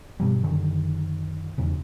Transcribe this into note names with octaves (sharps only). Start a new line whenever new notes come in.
G2 B2 F3 G3
F#2 D3 D#3
E2 C#3